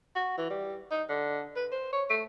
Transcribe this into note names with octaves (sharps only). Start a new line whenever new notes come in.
F#4
E3
G3
D#4
D3
B4
C5
C#5
A3